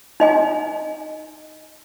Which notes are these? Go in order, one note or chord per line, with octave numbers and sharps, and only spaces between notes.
D#4 D#5 G#5